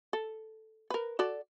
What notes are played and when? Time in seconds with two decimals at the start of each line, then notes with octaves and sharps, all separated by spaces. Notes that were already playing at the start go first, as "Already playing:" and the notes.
0.13 A4
0.90 A#4 B4
1.19 F#4 A4 D5